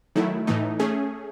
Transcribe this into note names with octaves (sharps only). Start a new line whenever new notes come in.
D#3 F#3 A3 E4
A2 E3 A3 D#4
A3 C#4 G#4